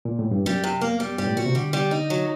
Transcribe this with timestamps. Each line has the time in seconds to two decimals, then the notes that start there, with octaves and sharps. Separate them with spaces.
0.05 A#2
0.19 A2
0.31 G2
0.46 F#2 G3
0.64 C3
0.81 A#3
1.00 G3
1.18 G2 G3
1.27 A2
1.37 A#2 F#4
1.46 C3
1.55 D3 G3
1.73 G3
1.91 D#4
2.10 F#3